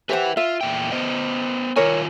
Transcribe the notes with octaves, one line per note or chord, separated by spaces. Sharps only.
G4 B4 C5 E5 F#5
F4 E5
E2 A#2 G5
B3 C5 D#5
D#3 F4 A#4 C#5 G#5